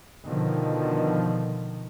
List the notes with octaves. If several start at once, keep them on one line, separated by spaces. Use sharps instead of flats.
B2 D3 D#3 F3